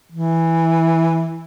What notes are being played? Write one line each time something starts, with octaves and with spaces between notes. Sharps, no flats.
E3